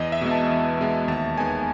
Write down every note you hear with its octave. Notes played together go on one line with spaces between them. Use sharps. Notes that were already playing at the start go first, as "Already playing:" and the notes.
Already playing: E2 D#5
E5
B2 G#3 B3
A5
E2
B2 G#3 B3
D#2 A5
D#3 G#3 B3 G#5